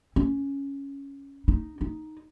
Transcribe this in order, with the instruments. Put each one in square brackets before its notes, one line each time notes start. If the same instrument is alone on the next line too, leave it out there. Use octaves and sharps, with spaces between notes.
[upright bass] C#4
D#4
D#4